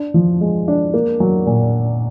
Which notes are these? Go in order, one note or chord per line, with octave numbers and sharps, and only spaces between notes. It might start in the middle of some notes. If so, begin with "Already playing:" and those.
Already playing: D4
F3
G#3
D4
A#3
F#3
A#2